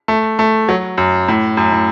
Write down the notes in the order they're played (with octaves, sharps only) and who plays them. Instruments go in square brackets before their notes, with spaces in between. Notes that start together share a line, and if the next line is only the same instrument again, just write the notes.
[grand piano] A3
A3
F#3
F#2
A2
F#2
A2